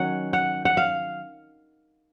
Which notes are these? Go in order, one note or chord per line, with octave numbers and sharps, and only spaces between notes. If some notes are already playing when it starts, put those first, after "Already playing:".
Already playing: D#3 F#3 C#4 F#5
F#5
F#5
F5